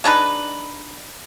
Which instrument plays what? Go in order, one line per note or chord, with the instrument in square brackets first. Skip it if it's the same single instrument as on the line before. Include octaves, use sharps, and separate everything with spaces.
[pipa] G#3 D4 D#4 B4